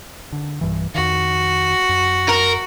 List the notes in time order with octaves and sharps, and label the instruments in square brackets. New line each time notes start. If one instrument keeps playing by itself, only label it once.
[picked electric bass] D3
B1 G2 E3
[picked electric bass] F2 D#3 [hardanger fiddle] F#4
[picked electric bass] F#2
[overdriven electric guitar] A#4